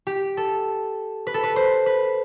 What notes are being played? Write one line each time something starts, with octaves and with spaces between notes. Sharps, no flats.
G4
A4
B4
A4
B4
C5
B4